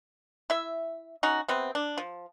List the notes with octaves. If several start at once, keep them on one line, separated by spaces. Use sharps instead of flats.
E4 E5
C#4 D#4 F#4
C3 B3 C4
D4
F3